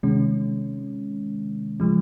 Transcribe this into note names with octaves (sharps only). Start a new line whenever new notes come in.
C3 D#3 G#3 C#4
C#3 F3 G#3